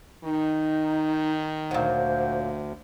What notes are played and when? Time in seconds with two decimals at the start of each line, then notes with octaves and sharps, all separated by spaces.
0.24 D#3 D#4
1.71 D2 A#2 F#3 C5